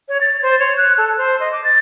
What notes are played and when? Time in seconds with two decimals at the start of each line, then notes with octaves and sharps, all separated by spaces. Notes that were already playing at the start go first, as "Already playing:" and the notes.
0.09 C#5
0.21 A6
0.43 C5
0.59 C#5
0.77 F#6
0.98 A4
1.17 C5
1.40 D#5
1.52 D6
1.64 A6